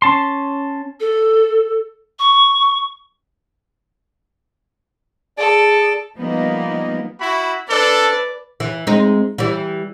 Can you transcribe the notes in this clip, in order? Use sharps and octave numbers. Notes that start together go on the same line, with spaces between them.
C#4 A5 C6
A4
C#6
G#4 A4 D5
F3 G3 A#3 B3 D#4
E4 F#4 B5
D4 A4 B4 D5
E3
G#3 C4 D#4
E3 G3